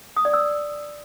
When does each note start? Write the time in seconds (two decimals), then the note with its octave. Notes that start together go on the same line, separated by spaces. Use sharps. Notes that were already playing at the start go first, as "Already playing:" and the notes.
0.17 D#6
0.25 D5
0.33 E6